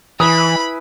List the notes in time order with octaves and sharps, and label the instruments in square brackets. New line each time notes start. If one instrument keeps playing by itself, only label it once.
[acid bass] E3 [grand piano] E4 B4 G#5 [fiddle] B5 [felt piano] D#6